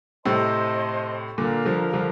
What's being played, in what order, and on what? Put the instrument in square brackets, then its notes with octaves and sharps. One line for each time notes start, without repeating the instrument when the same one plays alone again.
[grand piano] A2 C3 [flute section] C5 D#5 A5 C6
[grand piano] A#2 D3 [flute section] A#4 F5 A#5
[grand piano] D3 F3
D3 F3